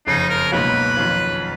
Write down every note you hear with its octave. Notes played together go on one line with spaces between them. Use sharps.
F#1 F2 C#3 D#4
A#4
C#2 B2 F#3 A#3 D#4 B4
F2 D#3 F#3 C#4 F4